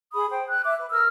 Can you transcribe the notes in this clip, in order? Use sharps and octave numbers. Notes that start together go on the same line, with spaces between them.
G#4 B5 D#6
C5 G5
F#6
E5 D6
B4
A#4 E6 F6